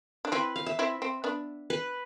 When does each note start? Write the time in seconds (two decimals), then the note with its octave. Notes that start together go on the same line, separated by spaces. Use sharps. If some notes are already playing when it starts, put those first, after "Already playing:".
0.25 D4
0.32 C4 E4 B4
0.56 F5
0.66 E5
0.79 C4 E4
1.02 C4
1.24 B3 D4
1.70 B4